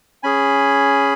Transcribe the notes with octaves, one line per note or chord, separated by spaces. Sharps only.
C#4 G#4 G#5 B5